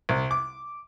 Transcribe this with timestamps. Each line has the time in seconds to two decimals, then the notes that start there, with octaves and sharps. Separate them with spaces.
0.09 C2
0.31 D6